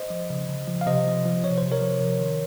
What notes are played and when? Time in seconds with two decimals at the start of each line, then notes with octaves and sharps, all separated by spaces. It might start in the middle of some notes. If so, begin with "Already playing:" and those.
Already playing: C5 D#5
0.10 F3
0.30 C#3
0.49 C#3
0.68 F3
0.81 F5
0.86 C3 C5 D#5
1.06 F3
1.25 F3
1.44 C3 C#5
1.58 C3 C5
1.72 A#4 C#5
1.82 F3
2.01 C3
2.20 D#3